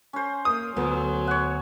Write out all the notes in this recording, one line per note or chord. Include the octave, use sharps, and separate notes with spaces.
C#4 C5
A#3 D#6
D2 F#3 B3
C#5 F#5